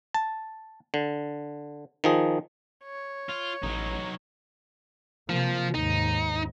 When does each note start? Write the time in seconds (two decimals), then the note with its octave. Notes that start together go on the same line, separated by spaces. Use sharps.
0.14 A5
0.94 D3
2.04 D#3 F3 G#4
2.84 C#5
3.29 F4
3.63 A1 F#3 D#4
5.29 C3 F3 A#3
5.75 D#2 G#2 D#4